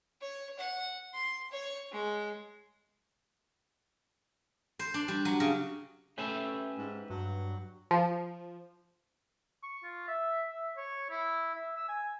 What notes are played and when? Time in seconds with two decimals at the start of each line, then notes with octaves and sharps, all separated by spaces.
0.21 C#5
0.58 F#5
1.14 C6
1.51 C#5
1.92 G#3
4.79 C5
4.94 D4
5.08 G3
5.25 F#3
5.40 C#3
6.18 A3 C#4 G4 B4 E5
6.78 G#2
7.10 G2 F#3
7.91 F3
9.63 C#6
9.83 F4
10.08 E5
10.50 E5
10.77 C#5
11.10 E4
11.55 E5
11.77 E6
11.89 G#5